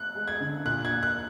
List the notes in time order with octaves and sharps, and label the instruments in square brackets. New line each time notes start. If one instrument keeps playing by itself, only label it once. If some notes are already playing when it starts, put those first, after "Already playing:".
Already playing: [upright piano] F#6
[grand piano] G#3
[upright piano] G#6
[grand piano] D3
[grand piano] A#2 [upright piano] F#6
[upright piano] G#6
[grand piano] A#3
[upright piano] F#6